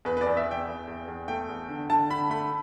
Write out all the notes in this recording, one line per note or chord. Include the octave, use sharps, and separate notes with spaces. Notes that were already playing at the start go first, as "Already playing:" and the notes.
E2 B4
B4
D5
E2
E5
E2 G5
E2
E2
E2
A3 G5
E2
D3
D3 A5
D3 B5
A3 B5